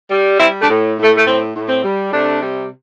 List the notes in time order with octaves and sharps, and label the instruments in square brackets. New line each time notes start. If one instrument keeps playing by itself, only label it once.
[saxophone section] G3
G3 C4 E4
A3 D4
A2
A2
A3
A3
A2 C4
A2
C4
G3
C3 A3 D4
G3